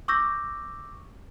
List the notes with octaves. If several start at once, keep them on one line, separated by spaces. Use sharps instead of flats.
C#6 D6 E6 G6 A#6